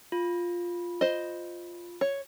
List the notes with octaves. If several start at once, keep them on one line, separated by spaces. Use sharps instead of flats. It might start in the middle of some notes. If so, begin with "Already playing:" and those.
F4
C5 D#5
C#5